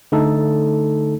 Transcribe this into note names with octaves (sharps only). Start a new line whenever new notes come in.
D3 A3 D#4 A4